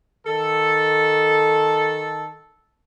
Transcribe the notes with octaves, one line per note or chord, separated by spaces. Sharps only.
D#3 A4